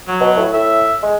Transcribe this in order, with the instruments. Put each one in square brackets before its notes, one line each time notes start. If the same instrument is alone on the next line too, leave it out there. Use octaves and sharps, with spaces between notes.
[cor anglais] F#3
[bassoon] B2
A2
[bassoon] A2 [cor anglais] E5
[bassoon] G#3